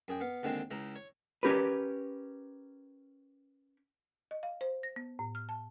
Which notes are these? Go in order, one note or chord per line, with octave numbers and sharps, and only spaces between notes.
F#2 G#4 G5
B3 F5
D#2 D3 D#3 G#3 C4
C#2 C#3 E4 A#5
C#5
C#4 G4 A#4 B4
D#5
F5
C5
A#6
B3
A2
F6
A5